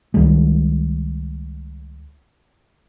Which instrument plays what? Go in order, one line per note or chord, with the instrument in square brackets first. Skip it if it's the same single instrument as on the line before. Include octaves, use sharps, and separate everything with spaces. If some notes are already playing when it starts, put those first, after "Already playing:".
[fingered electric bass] C#2 D#3 G3 G#3